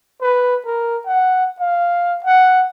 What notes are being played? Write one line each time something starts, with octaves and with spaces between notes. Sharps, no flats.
B4
A#4
F#5
F5
F#5